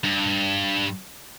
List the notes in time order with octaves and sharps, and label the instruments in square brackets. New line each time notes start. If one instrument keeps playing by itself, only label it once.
[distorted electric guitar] G2